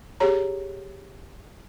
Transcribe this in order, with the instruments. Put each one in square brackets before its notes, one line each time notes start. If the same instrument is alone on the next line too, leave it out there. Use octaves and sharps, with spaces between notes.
[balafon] G4 G#4 C#5 A#5